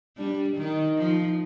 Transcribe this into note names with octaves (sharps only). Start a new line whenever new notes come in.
G3 D4
D#3 D#4
F3